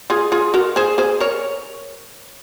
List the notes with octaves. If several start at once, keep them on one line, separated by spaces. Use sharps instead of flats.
F4 G#4
F4 G#4
F#4 A#4
G#4 C5
G#4 C5
A#4 C#5